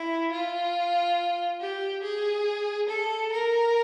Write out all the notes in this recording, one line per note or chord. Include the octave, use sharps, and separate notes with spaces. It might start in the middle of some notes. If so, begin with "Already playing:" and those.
Already playing: E4
F4
G4
G#4
A4
A#4